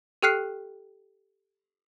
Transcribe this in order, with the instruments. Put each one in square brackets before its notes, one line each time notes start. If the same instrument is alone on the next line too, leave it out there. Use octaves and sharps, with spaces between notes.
[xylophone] G4 A4 G5 F6 F#6 C7